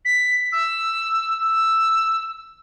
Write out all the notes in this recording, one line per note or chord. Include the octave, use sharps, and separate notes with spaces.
B6
E6
E6